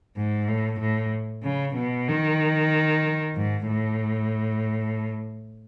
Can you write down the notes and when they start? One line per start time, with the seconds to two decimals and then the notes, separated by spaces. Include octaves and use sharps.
0.17 G#2
0.48 A2
0.80 A2
1.43 C#3
1.76 B2
2.08 D#3
3.36 G#2
3.67 A2